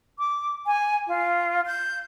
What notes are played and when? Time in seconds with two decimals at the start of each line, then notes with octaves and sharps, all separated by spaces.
0.19 D6
0.66 G#5
1.07 F4
1.66 G6